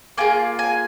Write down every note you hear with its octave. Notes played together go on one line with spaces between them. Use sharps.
A#3 F4 G#4 G#5
G#5